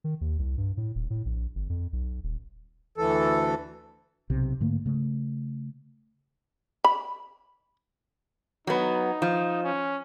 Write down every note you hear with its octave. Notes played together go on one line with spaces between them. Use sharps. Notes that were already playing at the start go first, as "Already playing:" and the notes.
D#3
D#2
C2
G2
A2
D#1
A2
A#1
G1
F2
B1
D#1
D2 E3 A4
B1 C3
G#2 D3 A3 A#3
C#3 A3
B5
F#3 B3 D#4
F3
C#4